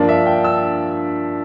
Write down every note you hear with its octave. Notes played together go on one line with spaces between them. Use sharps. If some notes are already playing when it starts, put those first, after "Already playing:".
Already playing: G2 F3 A#3 D4 D5
E5
G5
E6